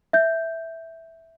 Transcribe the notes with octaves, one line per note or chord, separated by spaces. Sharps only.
E5 G6